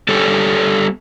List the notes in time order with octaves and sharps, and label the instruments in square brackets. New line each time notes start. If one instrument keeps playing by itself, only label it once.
[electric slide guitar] G3 B3 G4 A4 C#5